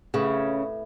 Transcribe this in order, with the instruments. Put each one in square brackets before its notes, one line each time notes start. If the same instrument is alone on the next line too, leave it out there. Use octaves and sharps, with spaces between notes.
[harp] A2 B4 [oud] C#3